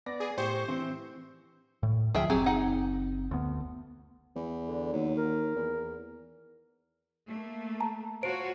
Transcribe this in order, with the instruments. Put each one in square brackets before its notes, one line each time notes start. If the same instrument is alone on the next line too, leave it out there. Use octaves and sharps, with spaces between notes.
[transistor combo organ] B3 D5 [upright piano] A#6
[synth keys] G#4
[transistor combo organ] A2 C#6 [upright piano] G4 [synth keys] C5
[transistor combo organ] E3 [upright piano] C4
[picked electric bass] A2
[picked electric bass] D2 D#3 F3 [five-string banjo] G#4 E5 G5
[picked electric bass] F#1 C4 [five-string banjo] F#3 G4 G#4
[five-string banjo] D#4 F#5
[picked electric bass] D2 B3
[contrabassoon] E2
[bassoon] D3
[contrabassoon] D#2 [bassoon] F#3
[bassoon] A#4
[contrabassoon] E2
[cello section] A3 A#3
[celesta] A5 A#5
[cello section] F4 F#4 C#5 [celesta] C5 D7